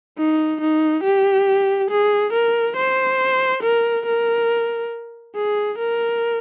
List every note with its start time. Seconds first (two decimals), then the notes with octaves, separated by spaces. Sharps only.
0.18 D#4
0.61 D#4
1.04 G4
1.90 G#4
2.33 A#4
2.77 C5
3.63 A#4
4.06 A#4
5.36 G#4
5.79 A#4